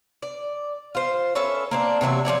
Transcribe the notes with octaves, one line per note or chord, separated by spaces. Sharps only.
D5
F4 C5
C#4 A4 B4 E5
A#3 C4 D4
C3 E3 F#3 E5
F3 A#3 C#5 D5